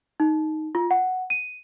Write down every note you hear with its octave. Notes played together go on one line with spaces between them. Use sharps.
D#4
F4
F#5
D#7